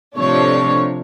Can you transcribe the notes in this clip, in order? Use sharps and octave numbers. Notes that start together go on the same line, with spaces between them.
C3 F3 A3 D4 C#5